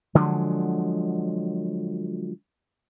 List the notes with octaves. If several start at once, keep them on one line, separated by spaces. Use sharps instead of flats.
D3 F3 F#3 G#3